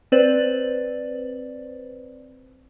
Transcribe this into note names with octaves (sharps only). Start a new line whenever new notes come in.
C4 B4 C5 D5 A6 F#7